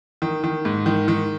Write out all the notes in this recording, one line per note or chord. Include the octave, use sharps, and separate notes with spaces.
D#3
D#3
G#2
D#3
D#3